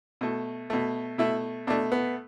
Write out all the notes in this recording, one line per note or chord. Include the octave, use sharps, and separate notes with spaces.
B2 A3
B2 A3
B2 A3 E4
B2 A3 D4
B3